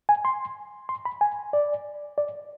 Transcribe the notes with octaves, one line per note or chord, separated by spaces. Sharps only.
G#5
C6
C6
B5
G#5
D5
D5